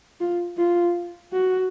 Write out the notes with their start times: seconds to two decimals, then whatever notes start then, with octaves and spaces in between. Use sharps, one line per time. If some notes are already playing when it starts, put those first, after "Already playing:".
0.20 F4
0.57 F4
1.32 F#4